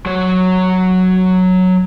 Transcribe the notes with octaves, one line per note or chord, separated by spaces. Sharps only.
F#3 C#5